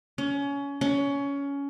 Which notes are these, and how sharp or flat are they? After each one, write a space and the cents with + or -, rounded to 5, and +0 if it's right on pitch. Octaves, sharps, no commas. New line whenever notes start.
C#4 +25
C#4 +20